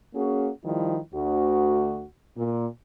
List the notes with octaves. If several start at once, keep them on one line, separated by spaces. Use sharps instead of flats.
A#3 C#4 F#4 G#4
D#3 F3 G3 E4
D2 F#4
A#2